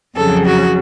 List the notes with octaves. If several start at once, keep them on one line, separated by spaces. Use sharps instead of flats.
F2 C#3 F#3 A4
F#4